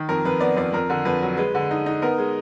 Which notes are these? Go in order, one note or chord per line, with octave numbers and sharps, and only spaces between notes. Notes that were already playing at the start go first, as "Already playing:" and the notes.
Already playing: D#3
F2 A#4
F2 B4
B3 D5
F2 D5
F2 A#4
D3
F2 B4
F#3
G#3 B4
D3
D#4
D#4
B3 A#4
G#3